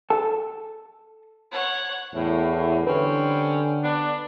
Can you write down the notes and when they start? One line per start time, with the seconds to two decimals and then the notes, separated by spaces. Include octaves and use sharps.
0.10 A4 A5
1.51 C#5 F#5
2.15 E2 A2
2.87 D3 G3 C4 C#4 B4
3.84 B3 D4